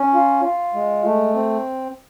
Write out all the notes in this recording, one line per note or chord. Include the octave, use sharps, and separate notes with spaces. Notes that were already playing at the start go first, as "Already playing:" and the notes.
Already playing: C#4
F4
F4
G#3
A3
C4